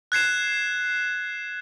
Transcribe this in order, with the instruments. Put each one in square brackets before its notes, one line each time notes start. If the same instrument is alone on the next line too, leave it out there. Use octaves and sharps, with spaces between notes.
[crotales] F#6 G#6 C7 E7